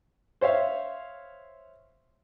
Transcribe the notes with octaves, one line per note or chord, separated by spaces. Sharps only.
C5 C#5 E5 F5